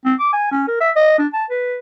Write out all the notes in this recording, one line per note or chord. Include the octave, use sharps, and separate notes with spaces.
C4
D6
G#5
C#4
A#4
E5
D#5
D4
A5
B4